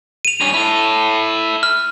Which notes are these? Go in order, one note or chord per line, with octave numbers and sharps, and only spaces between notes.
D#7 F7
G2 C#4
E4 A4
F6